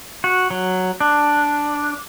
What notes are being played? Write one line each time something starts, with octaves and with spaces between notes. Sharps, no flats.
F#4
F#3
D4